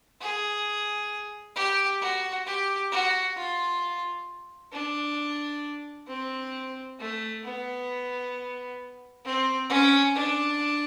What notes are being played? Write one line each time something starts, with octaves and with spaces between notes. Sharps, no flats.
G#4
G4
F#4
G4
F#4
F4
D4
C4
A3
B3
C4
C#4
D4